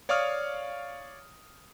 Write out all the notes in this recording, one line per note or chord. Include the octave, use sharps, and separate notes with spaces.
C#5 D5 F5 C#6 D#6 F6